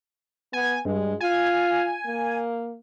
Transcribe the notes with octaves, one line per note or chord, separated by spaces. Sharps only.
B3 G#5
G2 G#3
F4 G#5
A#3